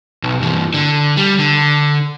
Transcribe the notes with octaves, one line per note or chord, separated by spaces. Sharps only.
B1
G2 E3
D3
G3
D3